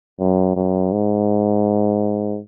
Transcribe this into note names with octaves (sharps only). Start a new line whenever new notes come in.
F#2
F#2
G#2